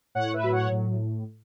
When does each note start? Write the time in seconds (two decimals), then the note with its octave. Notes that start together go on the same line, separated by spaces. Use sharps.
0.15 A2 C#5 F#5
0.34 B4 E5
0.43 F#3
0.52 C#5 F#5
0.71 A2